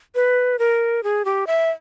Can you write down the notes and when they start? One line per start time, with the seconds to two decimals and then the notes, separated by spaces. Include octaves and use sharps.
0.15 B4
0.59 A#4
1.03 G#4
1.25 G4
1.47 E5